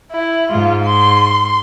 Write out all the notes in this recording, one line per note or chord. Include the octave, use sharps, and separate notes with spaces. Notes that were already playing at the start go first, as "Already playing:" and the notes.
E4
G#2 F4
C6